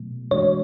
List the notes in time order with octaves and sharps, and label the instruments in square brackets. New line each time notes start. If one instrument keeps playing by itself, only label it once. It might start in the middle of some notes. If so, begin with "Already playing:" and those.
Already playing: [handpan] B2 F#3 A3
[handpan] E3 G#3 D4 F#4 [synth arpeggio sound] C#5